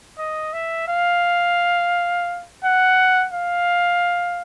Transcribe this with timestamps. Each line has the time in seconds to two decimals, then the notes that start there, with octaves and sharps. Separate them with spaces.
0.18 D#5
0.53 E5
0.88 F5
2.64 F#5
3.33 F5